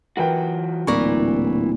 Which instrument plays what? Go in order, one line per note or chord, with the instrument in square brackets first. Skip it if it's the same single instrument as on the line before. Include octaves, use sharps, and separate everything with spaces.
[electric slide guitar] E3 F4 F#4 [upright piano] A#4 B4 G5
[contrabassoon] D1 [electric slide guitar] A#2 D5 [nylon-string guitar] E3 A#4 [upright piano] C#6